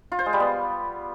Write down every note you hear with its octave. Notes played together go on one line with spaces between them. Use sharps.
F4
C5
G#3
G3
B3